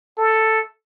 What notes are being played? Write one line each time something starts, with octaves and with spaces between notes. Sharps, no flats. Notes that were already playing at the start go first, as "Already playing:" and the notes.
A4